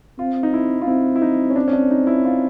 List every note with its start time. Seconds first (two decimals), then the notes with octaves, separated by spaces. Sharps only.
0.19 C4 F4
0.43 D#4
0.53 E4
0.82 F4
0.87 C4 E4
1.16 E4
1.22 D#4
1.50 C#4
1.56 D4
1.68 C#4
1.73 D4
1.91 D#4
2.07 E4
2.25 F4